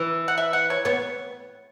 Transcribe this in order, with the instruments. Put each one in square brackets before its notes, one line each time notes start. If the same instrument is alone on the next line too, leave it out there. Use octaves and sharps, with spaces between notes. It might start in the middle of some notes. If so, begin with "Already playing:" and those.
Already playing: [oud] E3
[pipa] F#5
E5
F#5
C#5
[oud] B3 [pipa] C#5